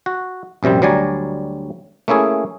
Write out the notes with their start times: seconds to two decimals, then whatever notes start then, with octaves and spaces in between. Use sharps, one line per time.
0.06 F#4
0.63 A#1 F#2 C3 G3 C4
0.82 D2 F#3 G3 D5 G#5 A#5
2.08 A3 A#3 C#4 E4 G#4